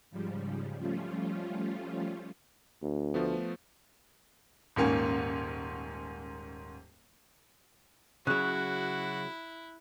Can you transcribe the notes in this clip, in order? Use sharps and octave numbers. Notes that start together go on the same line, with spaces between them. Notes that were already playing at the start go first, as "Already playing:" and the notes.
G#2 C#3 F3 G3
F3 G3 A3 C#4 F4
D2
F3 A3 B3
D#1 G#2 A#3 C#4
C#3 F#3 E4 F#4 F#6